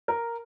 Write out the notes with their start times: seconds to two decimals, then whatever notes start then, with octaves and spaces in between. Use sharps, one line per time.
0.08 A#4